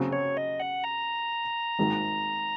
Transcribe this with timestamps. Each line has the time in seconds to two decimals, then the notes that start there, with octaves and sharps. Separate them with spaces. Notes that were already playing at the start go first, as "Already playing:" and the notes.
Already playing: C#3 F#3 C4 F#4
0.13 C#5
0.37 D#5
0.60 F#5
0.84 A#5
1.79 G#1 G#2 D#3